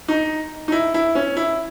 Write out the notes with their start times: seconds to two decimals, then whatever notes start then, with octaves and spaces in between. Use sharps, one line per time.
0.08 D#4
0.68 D#4
0.72 E4
0.94 E4
1.15 C#4
1.37 E4